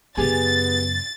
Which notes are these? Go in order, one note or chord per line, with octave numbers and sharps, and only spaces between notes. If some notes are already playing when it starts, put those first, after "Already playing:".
F#2 C#3 B3 G4 G#4 G#5 A6